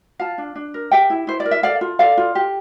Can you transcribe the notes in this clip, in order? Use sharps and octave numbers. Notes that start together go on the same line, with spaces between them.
F4 F5 A5
D4
D4
A#4
G4 E5 G5
E4
E4 C5
D5
A#4
E5
A4 D5 F5
F4
A4 D5 F5
F4
G4